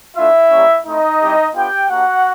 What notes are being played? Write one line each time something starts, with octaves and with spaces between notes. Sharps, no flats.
A3 D4 E4 F4 E5
G3 A#3 C#4
A3 C4 D#4 E4 D#5
G3 C4 E4 G4
B3 D4 F4 G4 G5
A#3 D4 F#4 G4 F#5